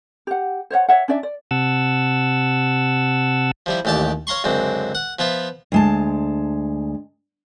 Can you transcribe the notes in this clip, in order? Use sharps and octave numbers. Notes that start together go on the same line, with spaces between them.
G4 F#5
C5 C#5 D#5 F#5
C#5 E5 F#5
C#4 D4 D5 E5
D5
C3 F#5 A5 E6
F3 G3 E4
A1 D#2 G4 D5 A5
C#5 F5 A#5 C6 C#6
C#2 F#2 D3 C4
F#5
F3 B3 F4 E5
D2 G#3 A5